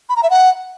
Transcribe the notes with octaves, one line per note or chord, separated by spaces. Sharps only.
B5
A#5
E5
F#5